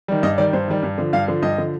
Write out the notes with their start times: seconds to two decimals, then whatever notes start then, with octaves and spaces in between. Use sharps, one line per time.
0.08 D#3 G3
0.23 G2 D#5
0.38 D#3 G3 D5
0.53 G2 C5
0.68 D#3 G3
0.83 G2
0.98 D3 F3
1.13 G2 F5
1.28 D3 F3
1.42 G2 D#5
1.58 D3 F3